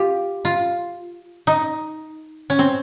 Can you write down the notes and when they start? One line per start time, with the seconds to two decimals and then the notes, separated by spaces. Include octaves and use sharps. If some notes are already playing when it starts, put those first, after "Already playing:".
Already playing: F4 G4
0.45 F4
1.47 D#4
2.50 C#4
2.59 C4